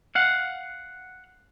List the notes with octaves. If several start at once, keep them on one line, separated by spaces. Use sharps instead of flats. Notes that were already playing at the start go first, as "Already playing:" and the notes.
F5 F#5